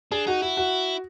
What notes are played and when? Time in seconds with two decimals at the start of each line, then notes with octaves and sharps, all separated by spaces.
0.12 D4 G#4
0.27 D#4 F#4
0.42 E4 F#4
0.57 F#4